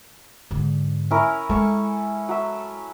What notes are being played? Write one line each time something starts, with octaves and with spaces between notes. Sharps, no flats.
G#2 D3
C#4 E4 A#4
G#3 A4 C#6
F#3 E5